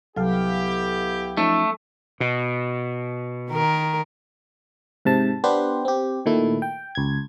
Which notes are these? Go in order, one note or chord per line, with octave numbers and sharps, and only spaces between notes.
C2 F#3 B3 E4 G4 A4 F5
F3 A3 C#4 D#4
B2
D#3 A#4
G#2 C3 A5
B3 D4 G4 B4 C5
C4 G4
A#2 D#3 A3 E4
G5
C#2 G#6